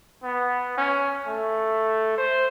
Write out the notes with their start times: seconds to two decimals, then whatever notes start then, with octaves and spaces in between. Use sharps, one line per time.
0.23 B3
0.78 C#4
1.27 A3
2.18 C5